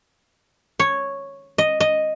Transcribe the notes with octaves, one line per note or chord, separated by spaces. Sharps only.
C#5
D#5
D#5